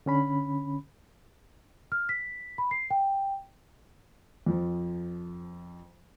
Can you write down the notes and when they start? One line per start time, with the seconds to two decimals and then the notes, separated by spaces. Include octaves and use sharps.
0.06 D3 C#4 B5
1.92 F6
2.09 B6
2.58 B5
2.71 C7
2.91 G5
4.46 F2 F3